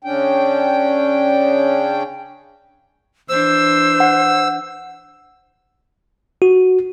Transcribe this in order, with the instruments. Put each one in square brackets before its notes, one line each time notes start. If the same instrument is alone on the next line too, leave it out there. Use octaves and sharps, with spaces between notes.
[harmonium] C#3 C#4 D4 G5
[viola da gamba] E3 D4 [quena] C5 [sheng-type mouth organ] E6
[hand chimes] F#5
[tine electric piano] F#4